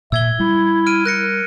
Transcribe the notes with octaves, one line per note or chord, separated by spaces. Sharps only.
A#2 E5 E6 G#6 G7
G3 E4
F6 D7 D#7
A#4 F#6 A#6 C#7